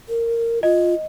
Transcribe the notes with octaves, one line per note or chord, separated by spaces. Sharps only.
A#4
F4 D#5